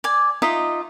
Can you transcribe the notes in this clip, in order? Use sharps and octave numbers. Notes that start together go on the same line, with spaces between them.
D5 G#5
D#4 F4 D#5 E5